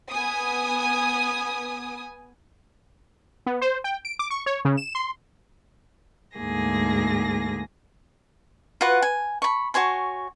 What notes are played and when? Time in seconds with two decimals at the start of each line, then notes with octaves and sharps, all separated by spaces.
0.11 B3 G#5 D#6
3.46 B3
3.61 C5
3.84 G5
4.05 D7
4.19 D6
4.30 C#6
4.46 C#5
4.65 C#3
4.77 E7
4.95 C6
6.37 D2 G#2 A#3 G#4 A#6
8.81 F4 F#4 B4 F#5
9.02 G#5
9.42 B5 C#6
9.74 F#4 C#5 G#5 C6